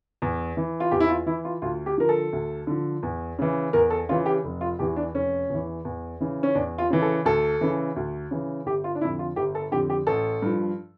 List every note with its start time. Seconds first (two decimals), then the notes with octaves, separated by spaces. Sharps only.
0.22 E2
0.57 E3
0.80 F4
0.91 E2 G4
1.00 E4
1.09 F4
1.26 E3 E4
1.45 F4
1.62 D2 F4
1.86 G4
1.98 D3 F3 A#4
2.09 A4
2.33 D2
2.67 D3 F3
3.03 E2
3.39 C#3 E3
3.73 E2 A#4
3.90 A4
4.09 C#3 E3 F4
4.26 G4
4.44 F1
4.61 F4
4.79 E2 E3 G4
4.96 D4
5.14 F1 C#4
5.50 E2 E3
5.85 E2
6.20 C#3 E3
6.43 C#4
6.55 E2 D4
6.78 F4
6.90 C#3 E3
7.02 A4
7.25 D2 A4
7.61 C#3 E3
7.96 D2
8.31 C#3 E3
8.66 G1 G4
8.84 F4
8.95 D4
9.01 F2 D3 E4
9.19 F4
9.36 G1 G4
9.55 A4
9.72 F2 D3 G4
9.90 G4
10.07 A1 A4
10.42 G2 F3